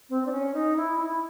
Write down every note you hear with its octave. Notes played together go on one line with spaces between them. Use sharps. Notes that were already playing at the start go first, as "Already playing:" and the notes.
C4
D4
C#4
D#4
E4
E4